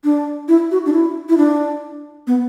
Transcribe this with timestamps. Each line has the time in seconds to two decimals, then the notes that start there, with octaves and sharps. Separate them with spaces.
0.04 D4
0.48 E4
0.71 F#4
0.86 D4
0.93 E4
1.29 E4
1.38 D4
2.27 B3